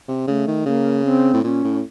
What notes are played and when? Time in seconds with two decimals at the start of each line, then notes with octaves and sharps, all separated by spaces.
0.08 C3
0.27 C#3 A3
0.47 D#3
0.66 C#3 A#3
1.05 C4
1.34 A2
1.44 A#2 C#4
1.64 A2